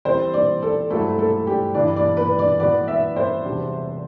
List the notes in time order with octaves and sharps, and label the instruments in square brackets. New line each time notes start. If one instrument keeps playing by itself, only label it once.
[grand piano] E3 G3 C4 [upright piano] C5
[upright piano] D5
A4
[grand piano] G2 F#3 A3 E4 [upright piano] A4
[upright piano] A4
G4
[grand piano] G2 E3 G3 D4 [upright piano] D5
[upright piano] D5
B4
D5
[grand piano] E3 B3 F#4 B4 [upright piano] D5
[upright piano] E5
C5
[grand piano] E2 C3 G3 D4 F#4